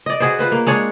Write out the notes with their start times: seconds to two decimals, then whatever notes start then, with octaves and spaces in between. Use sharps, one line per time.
0.06 D5 D#5
0.20 F#4 G#4 B4 C5
0.39 F4 B4 C5
0.52 A#3
0.67 G#3 D4 C#5